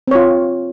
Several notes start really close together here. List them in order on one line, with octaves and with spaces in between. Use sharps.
C4 C#5 F4